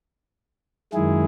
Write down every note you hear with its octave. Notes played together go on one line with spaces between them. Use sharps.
F#2 D#3 G#3 E4 G#4